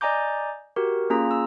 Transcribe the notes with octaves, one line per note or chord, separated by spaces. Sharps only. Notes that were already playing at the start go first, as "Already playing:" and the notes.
D5 D#5 G#5 A#5 D6 G6
F#4 G4 A#4
A#3 C#4 F4 G#4 A#5
E6